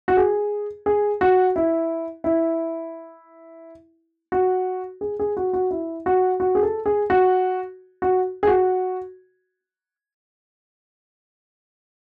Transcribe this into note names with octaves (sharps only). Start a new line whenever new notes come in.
F#4
G#4
G#4
F#4
E4
E4
F#4
G#4
G#4
F#4
F#4
E4
F#4
F#4
G#4
A4
G#4
F#4
F#4
G#4
F#4